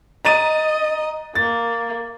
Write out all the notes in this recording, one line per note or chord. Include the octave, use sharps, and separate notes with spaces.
D#5 A#5 A6 D#7
A#3 A6